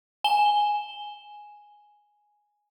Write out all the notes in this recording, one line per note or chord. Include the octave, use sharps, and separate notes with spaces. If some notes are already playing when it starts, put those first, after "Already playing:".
G#5 E7 G7